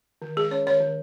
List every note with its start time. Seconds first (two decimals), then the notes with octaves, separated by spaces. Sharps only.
0.22 D#3
0.36 G#3 G#4
0.51 C#4 C#5
0.66 D#3 C#5
0.81 D#3